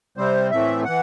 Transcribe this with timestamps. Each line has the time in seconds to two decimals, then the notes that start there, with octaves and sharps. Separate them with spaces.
0.17 C3 G3 C4 C5
0.51 A2 E3 A3 C4 E5
0.84 E3 F#5